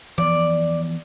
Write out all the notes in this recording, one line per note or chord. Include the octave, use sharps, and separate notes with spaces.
E3 F3 B3 D5